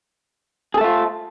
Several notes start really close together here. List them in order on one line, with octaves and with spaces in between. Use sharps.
G#4 A4 A3 F4